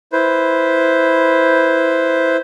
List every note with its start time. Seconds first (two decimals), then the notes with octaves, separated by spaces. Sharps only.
0.13 E4 B4 C5